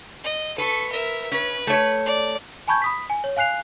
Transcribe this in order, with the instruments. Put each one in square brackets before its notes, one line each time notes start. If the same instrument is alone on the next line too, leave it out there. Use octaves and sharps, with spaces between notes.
[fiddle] D#5
[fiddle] A4 C#6 [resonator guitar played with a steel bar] B4
[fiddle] A#4 E5
[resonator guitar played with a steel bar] C#4 [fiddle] B4
[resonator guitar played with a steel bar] A3 C#5
[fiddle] D5
[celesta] G#5 A5 B5 C#6 G6 G#6
B5 D#6 B6
G#5
C#5
F5 G#5 F#6 C7 F7